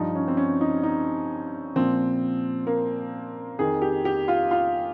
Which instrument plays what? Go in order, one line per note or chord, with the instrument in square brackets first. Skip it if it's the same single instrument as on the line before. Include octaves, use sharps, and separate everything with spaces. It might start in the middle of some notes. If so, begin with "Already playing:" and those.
Already playing: [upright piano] G2 F3 D#4
C#4
C4
C#4
D#4
D#4
A#2 F3 C4
A#3
F2 D#3 G#4
G4
G4
F4
F4